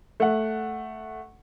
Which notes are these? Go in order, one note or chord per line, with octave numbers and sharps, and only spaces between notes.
A3 F#5